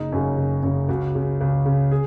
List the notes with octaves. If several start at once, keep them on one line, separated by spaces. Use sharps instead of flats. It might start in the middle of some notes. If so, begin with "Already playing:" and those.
Already playing: F#1 D#4
F#2 C#3
F#1
F#2 C#3
C#2 F#4
C#3
C#2
C#3
G#4